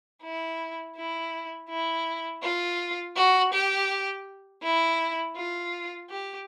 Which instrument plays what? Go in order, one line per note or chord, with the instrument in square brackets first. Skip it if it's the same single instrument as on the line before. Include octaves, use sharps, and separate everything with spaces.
[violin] E4
E4
E4
F4
F#4
G4
E4
F4
G4